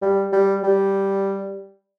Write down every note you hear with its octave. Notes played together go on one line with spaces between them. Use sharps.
G3
G3
G3